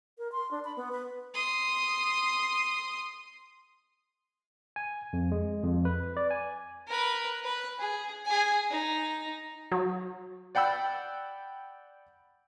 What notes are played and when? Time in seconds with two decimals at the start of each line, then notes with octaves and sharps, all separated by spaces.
0.18 A#4
0.32 C6
0.51 D4
0.64 B5
0.77 B3
0.92 B4
1.34 C6 D#6
4.76 G#5
5.13 F2
5.32 G#3
5.64 F2
5.85 B4
6.17 D5
6.31 G#5
6.87 A#4 B4
7.44 B4
7.79 G#4
8.25 G#4 G#5
8.70 D#4
9.72 F#3
10.55 D5 F#5 G5 B5 E6